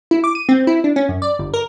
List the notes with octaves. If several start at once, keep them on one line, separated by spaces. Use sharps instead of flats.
E4
D6
D#7
C4
E4
D4
C#4
F#2
D5
G1
A#4